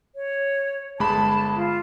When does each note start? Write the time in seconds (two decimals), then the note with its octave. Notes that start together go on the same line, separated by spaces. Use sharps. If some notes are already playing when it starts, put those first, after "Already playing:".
0.15 C#5
1.00 G1 G#3 A5 B5
1.56 F4